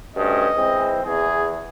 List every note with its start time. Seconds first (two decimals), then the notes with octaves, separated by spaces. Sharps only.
0.16 D2 G2 C#4 D#5
0.56 E3 G#3 C4
1.04 E2 G#4